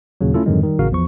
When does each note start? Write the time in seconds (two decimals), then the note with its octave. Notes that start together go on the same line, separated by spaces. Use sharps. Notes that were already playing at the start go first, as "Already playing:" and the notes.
0.21 D#2 A#2 C#3 F#3
0.34 A3 C#4 E4 F4 A4
0.46 F2 G#2 D3 D#3 F#3 G#3
0.63 D#3 G3
0.79 A1 A2 C#3 F#4 A#4 F5
0.92 E2 F3 C#6